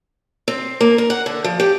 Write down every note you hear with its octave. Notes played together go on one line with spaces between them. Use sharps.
C4
A#3
A#4
F#5
D3
F3
G4